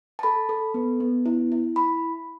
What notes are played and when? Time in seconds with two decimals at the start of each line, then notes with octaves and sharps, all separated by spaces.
0.19 A5
0.23 A4 B5
0.49 A4
0.74 B3
1.00 B3
1.26 E4
1.52 E4
1.76 B5